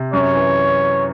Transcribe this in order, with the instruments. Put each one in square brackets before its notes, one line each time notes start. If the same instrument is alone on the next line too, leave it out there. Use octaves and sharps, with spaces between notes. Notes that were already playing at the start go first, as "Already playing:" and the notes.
Already playing: [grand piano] C3
[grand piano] F#2 [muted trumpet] C#5
[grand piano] E3